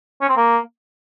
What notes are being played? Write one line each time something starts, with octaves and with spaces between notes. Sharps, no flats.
C#4
C4
A#3